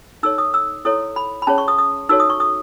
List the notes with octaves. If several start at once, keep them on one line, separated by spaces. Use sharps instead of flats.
D#4 A4 C#5 E6
D#6
E6
E4 A4 C#5 D#6
B5
B5
C#4 G#4 C#5 A5
C#6
D#6
D#6
D#4 F#4 A4 C#5 E6
D#6
C#6
D#6